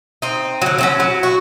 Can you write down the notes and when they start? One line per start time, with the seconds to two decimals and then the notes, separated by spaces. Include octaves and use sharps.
0.22 C4 D#4
0.62 D3 F#3
0.78 F#3 C4 C#4
1.00 F#3
1.23 F#4